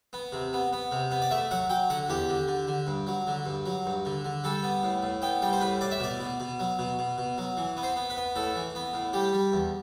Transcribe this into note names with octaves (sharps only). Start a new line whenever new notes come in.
B3
C3
B3
B3
C3
B3
D5
A3 E5
F#3 F#5
F#3 G5
D3 F#5
E2 G4
D3
D3
D3
G2
F#3
D3
G2
F#3
G2
D3
D3
G3 A4
B3
A2
A2
B3 G5
G3 G5
C5
A2 B4
A2 D5
E5
B2 D5
B2
B2
F#3
B2
B2
B2
F#3
E3
B3
C5
B3
B4
B3
A2 A4
E3
B3
A2
G3 G4
G3
E2